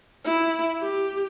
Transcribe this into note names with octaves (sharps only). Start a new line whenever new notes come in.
E4
G4